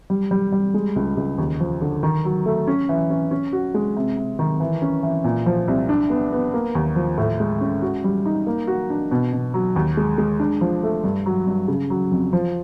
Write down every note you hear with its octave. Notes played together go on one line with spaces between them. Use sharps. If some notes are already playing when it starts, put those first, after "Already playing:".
G3
G3
G3
G#3
C#2
C#2
D#2
F3
D3
D#3
F#3
A3
C#4
E3
C#4
C#4
F#4
G#3
C3
C3
D#3
E3
C#4
E3
A#2
F3
C2
D4
B3
B3
A#3
D#2
F3
A2
G#3
C#4
F#4
G3
D#4
A#3
F#4
D4
B2
B2
F#3
D#2
G#3
G#3
D4
F3
A3
G2
F#3
G2
C#3
F#3
F2
F3